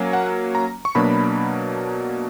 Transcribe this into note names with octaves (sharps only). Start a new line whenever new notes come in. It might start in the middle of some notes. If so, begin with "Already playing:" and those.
Already playing: F#3 A#3 C#4
F#5
A#5
C#6
B2 F#3 A#3 D4 B5